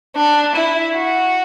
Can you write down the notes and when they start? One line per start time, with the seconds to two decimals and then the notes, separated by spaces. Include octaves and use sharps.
0.16 D4
0.55 E4
0.96 F#4